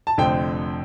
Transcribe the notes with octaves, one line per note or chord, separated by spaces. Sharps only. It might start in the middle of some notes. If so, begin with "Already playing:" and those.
A5
F1 F2 D3 A3 C4 G5